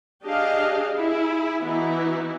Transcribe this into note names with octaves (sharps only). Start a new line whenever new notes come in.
D4 G4 G#4 D#5 F5
E4 G#4
E3 B3 D#4 E4 F#4